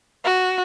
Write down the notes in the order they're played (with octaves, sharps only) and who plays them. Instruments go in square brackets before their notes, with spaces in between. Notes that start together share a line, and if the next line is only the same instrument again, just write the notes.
[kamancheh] F#4